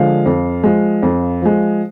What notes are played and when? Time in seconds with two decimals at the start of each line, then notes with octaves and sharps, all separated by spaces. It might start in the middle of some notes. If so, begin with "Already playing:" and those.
Already playing: D3 F3 G#3 F5
0.26 F2
0.63 F3 G#3
1.03 F2
1.42 F3 G#3